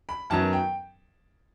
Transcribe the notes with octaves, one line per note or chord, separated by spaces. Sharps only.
B5
F#2 D#3 F#3 B3 A5
G5